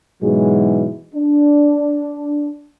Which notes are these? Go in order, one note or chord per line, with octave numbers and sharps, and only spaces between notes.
G#2 B2 E3 F#3 G#3
D4